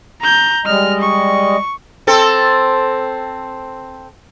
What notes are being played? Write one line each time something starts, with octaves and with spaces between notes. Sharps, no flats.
A#5 G6
G3 G#3 D#5 F6
C#6
C4 A4